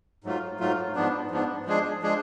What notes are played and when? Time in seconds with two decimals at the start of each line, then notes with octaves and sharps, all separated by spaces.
0.24 G#2 F#3 A3 F4
0.59 G#2 F#3 A3 F4
0.95 G#2 F3 B3 D4
1.31 G#2 F3 B3 D4
1.66 F3 G#3 D4 G#4
2.02 F3 G#3 D4 G#4